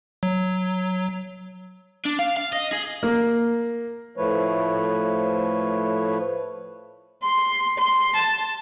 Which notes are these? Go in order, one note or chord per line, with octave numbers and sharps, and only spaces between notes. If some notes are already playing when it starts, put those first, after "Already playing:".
F#3
D4
F5
F5
D#5
G#4
A#3
A2 F3 A3 B4 C#5
C6
C6
A5